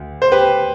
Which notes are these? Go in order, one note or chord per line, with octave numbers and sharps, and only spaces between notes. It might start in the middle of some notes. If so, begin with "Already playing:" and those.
Already playing: D2
C5
G4 B4